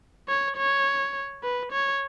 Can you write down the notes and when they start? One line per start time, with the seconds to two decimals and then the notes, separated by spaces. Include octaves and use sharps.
0.28 C#5
0.57 C#5
1.43 B4
1.72 C#5